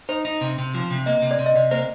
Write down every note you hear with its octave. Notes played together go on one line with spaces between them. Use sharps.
D#4 C5
D#4
C3
C3
F3
C3
A#3 D#5
C3
D5
C3
D#5
C3 D5
A#3 C5